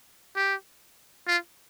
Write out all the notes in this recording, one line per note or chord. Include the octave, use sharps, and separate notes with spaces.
G4
F4